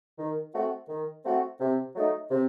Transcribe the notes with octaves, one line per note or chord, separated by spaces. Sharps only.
D#3
A3 C4 F#4
D#3
A3 C4 F#4
C3
F#3 A3 D#4
C3